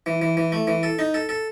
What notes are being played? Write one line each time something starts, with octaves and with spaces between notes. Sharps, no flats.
E3
E3
E3
A3
E3
A4
D#4
A4
A4